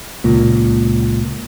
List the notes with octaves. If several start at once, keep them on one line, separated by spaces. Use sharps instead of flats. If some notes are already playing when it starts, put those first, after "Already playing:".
C#2 A#2